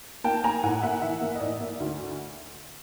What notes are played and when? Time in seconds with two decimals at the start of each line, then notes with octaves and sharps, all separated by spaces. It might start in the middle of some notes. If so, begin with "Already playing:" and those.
0.24 A#3 G5 A5
0.44 A#3 G#5 A#5
0.63 A2 F#5 G#5
0.82 A#3 E5 F#5
1.01 E3 E5 F#5
1.21 A#3
1.35 D#5
1.40 A2 D5 E5
1.61 A#3
1.80 D2